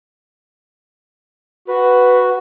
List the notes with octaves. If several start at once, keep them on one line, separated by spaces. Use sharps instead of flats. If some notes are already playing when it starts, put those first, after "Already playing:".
F#4 B4